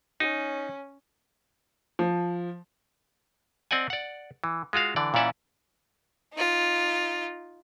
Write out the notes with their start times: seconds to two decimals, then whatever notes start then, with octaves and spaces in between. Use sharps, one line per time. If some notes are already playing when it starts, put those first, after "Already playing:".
0.20 C#4 D#4
1.99 F3
3.71 C4 D5 D#5 F#5 G#5
3.90 D5 F#5
4.44 E3
4.73 G#3 F4 F#4 F5
4.96 D3 E3 D5
5.14 A#2 E3 C#4 D5 E5 F#5
6.34 D#4 F4